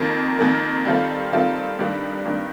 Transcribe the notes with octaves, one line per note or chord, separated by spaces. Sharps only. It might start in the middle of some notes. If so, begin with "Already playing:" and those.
Already playing: F2 D#3 A#3
F2 D#3 A#3
D#3 G3 C4 F4 A4
D#3 G3 C4 F4 A4
G2 D#3 G3 D4
G2 D#3 G3 D4